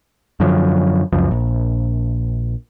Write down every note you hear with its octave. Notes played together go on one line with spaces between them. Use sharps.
F#2 D3 F3 F#3
C#2 F#2 F3
A#1